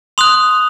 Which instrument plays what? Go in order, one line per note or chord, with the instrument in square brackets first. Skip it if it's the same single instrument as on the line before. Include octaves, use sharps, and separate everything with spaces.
[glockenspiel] C6 D#6 F#6 F7